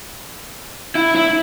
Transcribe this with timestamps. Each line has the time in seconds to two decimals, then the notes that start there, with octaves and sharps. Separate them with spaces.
0.95 E4
1.16 E4